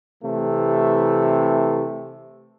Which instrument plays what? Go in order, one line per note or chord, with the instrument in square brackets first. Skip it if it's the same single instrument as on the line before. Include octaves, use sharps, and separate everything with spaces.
[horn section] C3 E3 A3